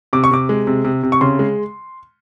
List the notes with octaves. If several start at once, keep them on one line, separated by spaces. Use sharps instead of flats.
C3 D6
C#6
C3 D6
G#3
C3
C3
C3
C#6
C#3 C6
G#3